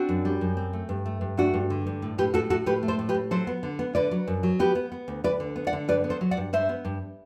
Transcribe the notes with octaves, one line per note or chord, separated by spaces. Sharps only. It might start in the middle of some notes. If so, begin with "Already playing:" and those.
Already playing: C4 D4 F#4
F#2
G3
F#2
C4
A3
G2
A3
G2
A3 D4 F#4
G2
D3
G2
A2
A2 G4 B4
A2 F#4 A4
A2 F#4 A4
A2 G4 B4
A3
A4 C5
A2
G4 B4
A2
F#3 A4 C5
B3
D3
B3
D3 B4 D5
F#3
F#2
F#3
B3 G4 B4
B3
B3
D2
D2 B4 D5
D3
B3
D5 F#5
D3
G2 B4 D5
B3
A4 C5
F#3
D5 F#5
G2
G2 C5 E5
B3
G2